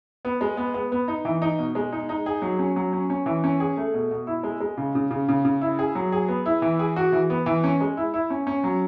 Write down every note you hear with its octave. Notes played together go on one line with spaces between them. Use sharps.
B3
G#3
B3
B3
B3
D#4
E3
D#4
B2
G#3
D#4
D#4
G#4
F#3
C#4
F#3
C#4
C#4
E3
C#4
G#4
A3
B2
B2
E4
G#3
G#3
C#3
C#3
C#3
C#3
C#3
E4
G#4
F#3
G#4
B3
E4
E3
G#4
F#4
E3
B3
E3
C#4
G#3
E4
E4
C#4
C#4
F#3